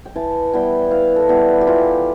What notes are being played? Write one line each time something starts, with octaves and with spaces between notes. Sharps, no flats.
G5
E3 A5
G3 B3 E4 G5
E3 F5
A4
G3 B3 E4
G4
E3 F4